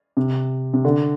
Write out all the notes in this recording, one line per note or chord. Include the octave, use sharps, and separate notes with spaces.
C3
C3
D3